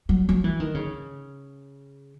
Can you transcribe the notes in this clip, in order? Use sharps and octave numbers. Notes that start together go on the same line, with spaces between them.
F#3
F#3
E3
D#3
C#3